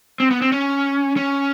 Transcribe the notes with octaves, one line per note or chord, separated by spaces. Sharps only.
C4
B3
C4
C#4
C#4